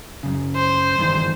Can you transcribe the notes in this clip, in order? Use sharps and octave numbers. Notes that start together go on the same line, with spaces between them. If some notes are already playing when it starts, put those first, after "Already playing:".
F#2 C#3
C5
G2 D#3 E3